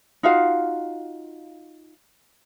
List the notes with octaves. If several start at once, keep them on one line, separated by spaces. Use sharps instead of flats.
D#4 F4 F#4 F5